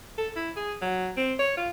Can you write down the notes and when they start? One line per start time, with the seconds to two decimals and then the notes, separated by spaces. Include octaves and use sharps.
0.18 A4
0.36 E4
0.56 G#4
0.82 F#3
1.17 C4
1.39 C#5
1.57 F4